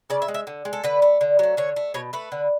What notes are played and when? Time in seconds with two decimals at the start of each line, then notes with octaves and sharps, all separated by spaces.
0.10 C#3 D5
0.22 E5
0.28 G#3
0.34 E5
0.47 D3
0.65 G#3
0.73 A4
0.84 D3 B4
1.02 A3
1.21 D3
1.39 F#3 A3
1.57 D3 C#5
1.76 A3
1.94 B2 C#5
2.13 A3 B4
2.32 D3